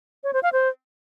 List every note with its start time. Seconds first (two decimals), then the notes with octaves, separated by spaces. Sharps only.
0.24 C#5
0.33 C5
0.43 F5
0.53 C5